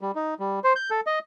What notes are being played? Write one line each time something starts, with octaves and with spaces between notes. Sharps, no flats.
G3
D#4
G3
C5
G6
A4
D#5